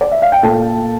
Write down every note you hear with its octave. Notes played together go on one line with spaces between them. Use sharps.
D5
E5
F5
G5
A#2 A4 A5